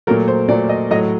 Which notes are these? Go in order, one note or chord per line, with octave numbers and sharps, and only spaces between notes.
A#2 F#3 A3 A#4
C5
A#2 F#3 A3 D5
D#5
A2 F#3 A3 D#5